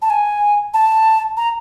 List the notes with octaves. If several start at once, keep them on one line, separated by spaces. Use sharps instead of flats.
A5
G#5
A5
A#5